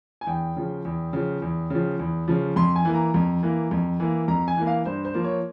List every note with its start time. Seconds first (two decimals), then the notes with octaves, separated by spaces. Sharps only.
0.21 G#5
0.27 E2 G5
0.57 C#3 F3
0.85 E2
1.13 C#3 F3
1.42 E2
1.70 C#3 F3
1.99 E2
2.28 C#3 F3
2.56 F2 C6
2.76 G#5
2.85 E3 A#3
2.94 A#5
3.14 F2
3.43 E3 A#3
3.71 F2
4.00 E3 A#3
4.28 F2 A#5
4.48 G#5
4.57 E3 A#3
4.67 F5
4.85 G2 C5
5.05 C5
5.14 F3 A#3
5.24 C#5